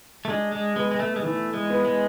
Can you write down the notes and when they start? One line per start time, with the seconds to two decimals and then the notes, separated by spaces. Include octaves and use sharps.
0.25 A3
0.30 G#3 D4
0.52 G#3
0.76 G#3 B3
0.91 G#3
1.00 A3
1.16 G#3
1.22 E3 A3
1.54 G#3
1.70 B3
1.85 G#3